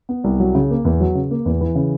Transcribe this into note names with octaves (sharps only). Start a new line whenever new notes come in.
B3
C2
F#3
C#3
A#3
E2
F#3
C#3
A#3
E2
E3
C#3